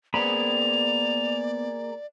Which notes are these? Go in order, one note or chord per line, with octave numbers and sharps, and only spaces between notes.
A#3 B3 G#4 B4 C5 D5 B5 F7